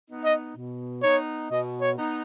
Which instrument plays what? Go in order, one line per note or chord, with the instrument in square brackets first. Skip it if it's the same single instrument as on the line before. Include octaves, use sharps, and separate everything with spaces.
[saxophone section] B3 D#4
[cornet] D#5
[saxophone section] B2
[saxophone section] B3 D#4 [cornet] C#5
[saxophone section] B2 [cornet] D#5
[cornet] C#5
[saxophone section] B3 D#4